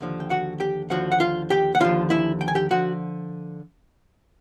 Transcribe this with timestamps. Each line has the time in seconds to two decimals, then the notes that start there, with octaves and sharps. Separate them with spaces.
0.01 D#2 D3 F3
0.20 G5
0.30 F#4 F#5
0.60 G4 G5
0.90 D#2 D3 F3 F#4 F#5
1.12 F#5
1.20 F4 F5
1.50 G4 G5
1.75 F#5
1.80 D#2 D3 F3 F4 F5
2.10 E4 E5
2.41 G5
2.48 G#5
2.55 G4 G5
2.71 D3 F3 F#4 F#5